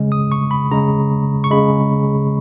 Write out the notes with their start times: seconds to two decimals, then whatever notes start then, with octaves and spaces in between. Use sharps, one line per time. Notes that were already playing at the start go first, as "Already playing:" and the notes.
Already playing: C#3 G#3
0.12 D#6
0.32 C#6
0.51 B5
0.71 C#3 G#3 A#5
1.44 C#6
1.51 C#3 G#3 B5